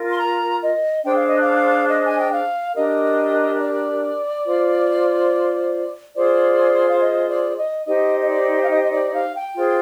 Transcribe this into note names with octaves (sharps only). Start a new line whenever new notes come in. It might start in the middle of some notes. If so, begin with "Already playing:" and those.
Already playing: F4 A#4
C6
A#5
D#5
D4 G#4 C5 G5
F5
D#5
F5
D#5
G#5
G5
F5
D4 G4 A#4 D#5
D5
F4 C5
F4 G#4 C5 D5
F5
D#5
D5
D#5
D#4 G4 C5 D#5
D#5
D5
F5
D#5
D#5
D5
F5
G5
F4 G#4 C5